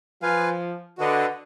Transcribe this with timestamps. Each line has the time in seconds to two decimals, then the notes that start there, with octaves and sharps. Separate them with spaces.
0.22 F3 F4 B4 F5 G#5
0.98 D3 F#4 B4 D#5 F#5